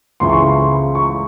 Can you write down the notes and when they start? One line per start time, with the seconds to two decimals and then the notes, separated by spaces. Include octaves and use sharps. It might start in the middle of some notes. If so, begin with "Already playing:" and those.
0.20 C#2 C#3 E3 C6
0.30 C#6
0.39 C6
0.95 C#6